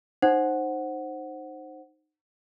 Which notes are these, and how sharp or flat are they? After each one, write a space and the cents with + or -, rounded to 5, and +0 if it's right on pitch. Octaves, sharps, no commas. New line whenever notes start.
D#4 -20 C5 +15 F#5 +0